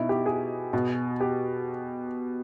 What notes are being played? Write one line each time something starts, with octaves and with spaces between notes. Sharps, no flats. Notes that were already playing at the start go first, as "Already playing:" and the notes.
Already playing: B2 D#4 E4
G4
G#4
B2
G4